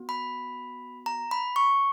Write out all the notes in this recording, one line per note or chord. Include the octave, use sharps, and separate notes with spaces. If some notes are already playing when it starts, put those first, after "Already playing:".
Already playing: B3 F#4
B5
A#5
B5
C#6